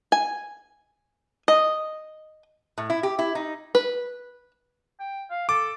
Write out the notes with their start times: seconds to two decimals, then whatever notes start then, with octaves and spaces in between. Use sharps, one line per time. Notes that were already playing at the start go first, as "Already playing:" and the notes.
0.12 G#5
1.48 D#5
2.78 A2
2.90 E4
3.03 G4
3.19 E4
3.35 D#4
3.75 B4
5.00 G5
5.30 F5
5.49 A4 D6